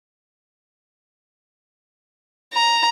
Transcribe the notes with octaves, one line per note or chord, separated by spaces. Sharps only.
A#5